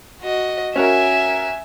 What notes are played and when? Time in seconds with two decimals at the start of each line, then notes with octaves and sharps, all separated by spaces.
0.22 F#4 D#5
0.76 C#4 F#4 A#4 E5 G#5